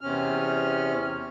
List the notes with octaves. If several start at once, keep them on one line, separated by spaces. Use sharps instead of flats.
E2 C3 C#4 F6